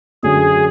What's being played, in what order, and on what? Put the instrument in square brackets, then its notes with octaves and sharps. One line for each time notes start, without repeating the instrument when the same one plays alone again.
[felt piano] F#2 D3 A3 [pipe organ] G#4